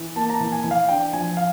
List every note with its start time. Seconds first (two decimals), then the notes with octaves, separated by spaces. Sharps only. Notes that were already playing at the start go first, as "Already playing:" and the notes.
Already playing: E3
0.16 A#3 A5
0.30 A#5
0.34 A5
0.41 E3
0.52 G#5
0.64 E3
0.71 F5
0.89 D4 G5
1.13 F3 G#5
1.37 F5